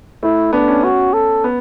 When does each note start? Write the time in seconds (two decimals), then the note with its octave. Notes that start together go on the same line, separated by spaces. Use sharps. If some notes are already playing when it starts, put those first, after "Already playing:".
0.23 A3 E4
0.53 B3 D4
0.68 C#4
0.84 F#4
1.13 A4
1.44 B3